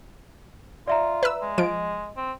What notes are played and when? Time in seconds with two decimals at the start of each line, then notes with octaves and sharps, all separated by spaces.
0.88 F4 D5 E5 A#5
1.23 B4 E6
1.42 G#3
1.58 F3 D#5 D7
2.17 C4